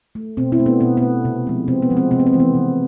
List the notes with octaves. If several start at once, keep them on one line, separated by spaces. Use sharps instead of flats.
A3
B2 C4
C4 E4
A3
B3 D4
B2 B3
B3
A3
C3
F3 G#3
C3 C4
B3
F3 G#3
C4
C3 C4
B3
C4
E3 A3
B3
C3